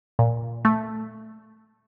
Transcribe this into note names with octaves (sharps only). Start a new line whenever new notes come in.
A#2
A3